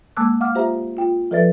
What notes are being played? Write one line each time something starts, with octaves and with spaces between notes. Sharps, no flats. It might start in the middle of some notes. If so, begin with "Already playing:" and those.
G#3 A#3 A5 D6 E6 F#6
F5 F#5 D6 F6
F4 G4 C5 E5 A#5
F4 G5
F3 A4 B4 D5 E5 A6